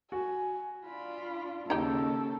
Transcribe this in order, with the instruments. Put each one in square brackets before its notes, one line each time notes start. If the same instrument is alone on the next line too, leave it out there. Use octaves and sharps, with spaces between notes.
[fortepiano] F#4 [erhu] G#5
[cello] D4 F4 [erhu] B5
[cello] D#2 C#3 [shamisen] D#4 G4 [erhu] A4